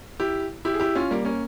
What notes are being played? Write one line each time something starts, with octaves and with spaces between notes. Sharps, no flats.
E4 G4
E4 G4
G#4
E4 G4
C#4 F4
G3 A#3
A#3 C#4